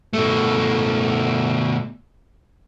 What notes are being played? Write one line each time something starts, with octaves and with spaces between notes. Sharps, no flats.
B2 A3